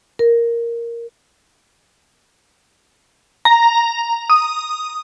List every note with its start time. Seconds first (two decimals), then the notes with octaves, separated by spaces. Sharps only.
0.19 A#4
3.45 A#5
4.30 D#6